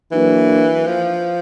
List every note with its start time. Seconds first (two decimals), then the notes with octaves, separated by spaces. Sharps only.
0.12 E3 F#3 A#3 D4 F#4 B4
0.86 F3